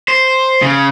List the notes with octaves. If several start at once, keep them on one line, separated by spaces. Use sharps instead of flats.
C5
C#3